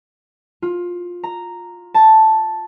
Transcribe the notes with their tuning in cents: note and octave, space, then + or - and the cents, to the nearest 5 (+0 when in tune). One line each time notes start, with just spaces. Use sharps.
F4 +15
A#5 -5
A5 +0